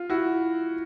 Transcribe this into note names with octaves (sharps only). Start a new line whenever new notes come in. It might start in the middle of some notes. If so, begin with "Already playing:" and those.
Already playing: F4
E4 F#4